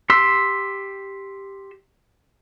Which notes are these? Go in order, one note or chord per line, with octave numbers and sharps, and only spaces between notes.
G4 C6 E6